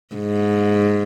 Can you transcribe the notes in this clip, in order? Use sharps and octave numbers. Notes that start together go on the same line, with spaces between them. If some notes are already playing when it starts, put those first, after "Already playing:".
G#2